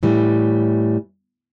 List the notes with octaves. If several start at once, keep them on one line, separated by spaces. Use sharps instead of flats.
A2 E3 G3